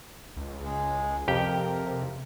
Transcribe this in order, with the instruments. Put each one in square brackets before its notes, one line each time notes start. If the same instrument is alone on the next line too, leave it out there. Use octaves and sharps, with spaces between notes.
[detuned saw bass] C#2
[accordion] G#3
[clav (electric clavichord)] F2 G4 G5 [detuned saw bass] C3 [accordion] A#4